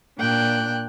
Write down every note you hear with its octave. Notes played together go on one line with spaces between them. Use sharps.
A#2 D4 G5 F#6